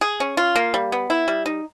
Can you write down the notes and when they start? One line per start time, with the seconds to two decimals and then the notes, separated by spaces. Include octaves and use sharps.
0.01 G#4
0.20 C#4
0.37 F4
0.56 A#3
0.74 G3
0.92 B3
1.10 E4
1.28 G3
1.46 D#4